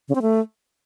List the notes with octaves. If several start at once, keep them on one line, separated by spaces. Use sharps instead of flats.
C#3
C4
A3